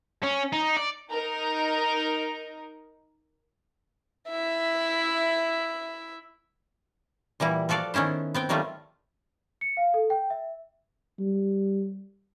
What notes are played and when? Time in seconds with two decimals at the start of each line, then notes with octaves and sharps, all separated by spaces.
0.23 C#4
0.53 D#4
0.77 D5
1.12 D#4 A#4
4.28 E4 E5
7.40 A#2 E3 G3 E4
7.69 F3 F#4 A4 D5 F5
7.94 D#3 B3 C#4 E4 C5
8.34 B3 C4 G5
8.49 D#3 F#3 G3 A3 F4
9.61 C#7
9.77 F5
9.94 A4
10.10 G5
10.30 E5
11.19 G3